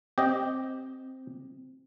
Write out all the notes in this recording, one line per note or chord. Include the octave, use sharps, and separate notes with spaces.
C4 G4 D#5